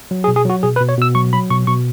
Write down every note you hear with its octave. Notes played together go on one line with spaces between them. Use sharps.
F#3
G#4
B2
G#4
F#3 F#4
B2 G#4
B4
B2
C#5
B2 E6
F#3 C#6
F#3 B5
B2 C#6
B2 C#6